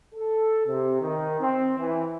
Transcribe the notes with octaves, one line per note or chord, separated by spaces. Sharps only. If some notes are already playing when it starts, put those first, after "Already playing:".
A4
C3
D#3
C4
E3